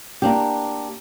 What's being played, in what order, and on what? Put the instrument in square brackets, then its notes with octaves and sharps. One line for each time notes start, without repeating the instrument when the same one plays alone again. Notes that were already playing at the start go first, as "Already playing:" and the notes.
[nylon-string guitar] A#3 D4 G4